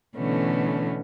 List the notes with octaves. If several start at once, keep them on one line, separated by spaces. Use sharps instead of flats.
B2 D3 E3 A3 B3 C#4